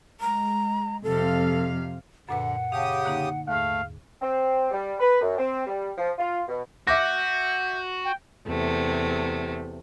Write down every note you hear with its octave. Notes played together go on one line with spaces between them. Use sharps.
G#3 A#5
F2 C3 A4 F5
F#2 A#2 D3 B4 F#5
C#3 G4 F5 A5 D#6
D3 A#3 D#4
D#2 G#2 A3 F5
C4
G3
B4
F#2
C4
G3
F3
F4
B2
F#4 E5 D6 G6 A#6
G5
E2 C3 A3